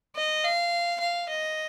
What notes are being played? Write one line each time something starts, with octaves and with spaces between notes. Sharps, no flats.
D#5
F5
F5
D#5